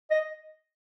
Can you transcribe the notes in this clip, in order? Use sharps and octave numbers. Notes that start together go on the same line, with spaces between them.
D#5